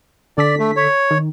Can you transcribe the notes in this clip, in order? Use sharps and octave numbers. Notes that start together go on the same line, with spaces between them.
D3 A4 D5 B6
A3
C#5
D#3